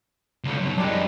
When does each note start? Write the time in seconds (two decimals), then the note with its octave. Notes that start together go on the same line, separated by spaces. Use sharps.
0.44 C#2 D3
0.60 F#2 B2
0.77 F#2 G3 G#3 D4